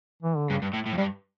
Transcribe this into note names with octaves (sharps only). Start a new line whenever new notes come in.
E3
D3
G2 C#3
G2
A2
A2
F2
G2 G3